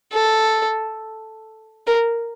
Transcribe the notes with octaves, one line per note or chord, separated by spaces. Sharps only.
A4
A#4